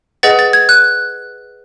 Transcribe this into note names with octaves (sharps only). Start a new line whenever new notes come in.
G#4 B4 D#5 F#5 A6
A6
G#6
F#6